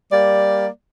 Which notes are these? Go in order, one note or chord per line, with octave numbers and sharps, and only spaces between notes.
G3 A#3 D5